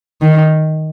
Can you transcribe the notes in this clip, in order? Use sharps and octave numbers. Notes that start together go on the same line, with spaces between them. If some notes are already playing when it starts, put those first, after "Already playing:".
D#3